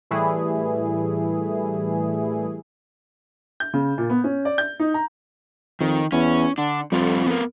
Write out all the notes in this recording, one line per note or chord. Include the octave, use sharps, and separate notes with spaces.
A2 E3 G3 A3 E4 G#4
G6
C#3
A#2
B3
C#4
D5
G6
D#4
A#5
F2 D#3
E2 C#4
D3 D4
F2 G3 F4 A4
B3 A#4